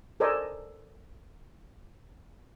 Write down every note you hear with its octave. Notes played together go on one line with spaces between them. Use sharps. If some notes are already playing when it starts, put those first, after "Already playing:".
A4 A#4 C5 D5 D#5 G#5